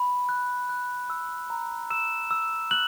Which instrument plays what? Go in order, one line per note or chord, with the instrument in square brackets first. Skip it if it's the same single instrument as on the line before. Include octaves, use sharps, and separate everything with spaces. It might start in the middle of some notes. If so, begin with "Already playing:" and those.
Already playing: [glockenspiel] B5
F#6
F#6
E6
A#5
E6 E7
E6
F#6 F#7